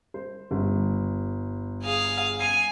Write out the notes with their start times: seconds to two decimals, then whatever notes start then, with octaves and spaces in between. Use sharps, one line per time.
0.14 C5
0.51 G1
1.83 G#4 F5
2.40 G#5 C7 F7